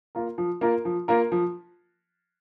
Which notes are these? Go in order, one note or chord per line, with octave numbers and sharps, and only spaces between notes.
A#3 F4 A#4
F3
A#3 F4 A#4
F3
A#3 F4 A#4
F3